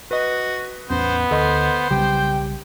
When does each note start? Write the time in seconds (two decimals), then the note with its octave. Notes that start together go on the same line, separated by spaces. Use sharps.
0.11 F#4 B4 D#5
0.90 A1 E2 B3 C#4 C5
1.31 D2 A4 C5 D#5 C6
1.91 B1 C#3 G3 G4 G5